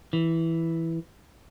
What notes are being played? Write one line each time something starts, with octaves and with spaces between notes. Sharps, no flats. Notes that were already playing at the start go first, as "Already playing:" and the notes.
E3